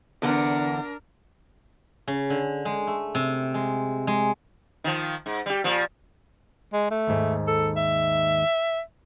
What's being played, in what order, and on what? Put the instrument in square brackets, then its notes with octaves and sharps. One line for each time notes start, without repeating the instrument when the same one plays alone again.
[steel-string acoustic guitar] E2 D3 F#5 [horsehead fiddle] D4 A#4
[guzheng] C#3
D3
G#3
A3
C3
G#3
G#3
[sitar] D#3 F3
G#2
G3 G4
A#2 F3
[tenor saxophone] G#3
A3
[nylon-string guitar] D#2 G#2
[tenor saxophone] A4
E5